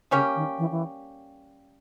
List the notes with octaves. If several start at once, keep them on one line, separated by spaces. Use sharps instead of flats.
C#3 G3 A#3 C#4 G4
D#3
E3
E3